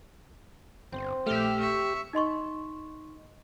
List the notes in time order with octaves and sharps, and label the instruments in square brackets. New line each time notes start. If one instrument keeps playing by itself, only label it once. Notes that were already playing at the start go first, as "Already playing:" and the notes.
[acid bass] G1 [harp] C4
[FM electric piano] A#1 A3 [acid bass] G4 [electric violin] E5 F6
[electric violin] E5 C#6
[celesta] D#4 D#5 C6 C#6